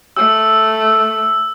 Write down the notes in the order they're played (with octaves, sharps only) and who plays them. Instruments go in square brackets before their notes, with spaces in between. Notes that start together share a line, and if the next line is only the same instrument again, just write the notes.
[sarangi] A3 [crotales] E6